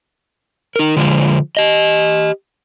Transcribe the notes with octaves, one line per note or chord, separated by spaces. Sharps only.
D#4 A#4
D3 F3 G#3
G4 D#5